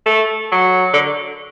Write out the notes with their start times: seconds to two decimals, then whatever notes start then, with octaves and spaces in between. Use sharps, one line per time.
0.06 A3
0.52 F#3
0.93 D3